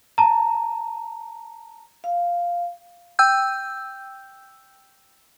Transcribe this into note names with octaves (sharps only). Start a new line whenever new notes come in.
A5 A#5
F5
G5 E6 G6